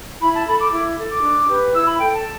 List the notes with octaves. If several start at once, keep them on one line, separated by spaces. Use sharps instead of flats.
E4 B5
A5
A4 B5
D6
E4 D6
A4
D6
D4
G4 B4
E4 E6
B5
A4 G5
A5